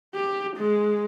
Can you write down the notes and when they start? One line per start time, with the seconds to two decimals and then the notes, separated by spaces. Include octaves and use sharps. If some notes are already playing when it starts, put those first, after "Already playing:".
0.15 G4
0.57 G#3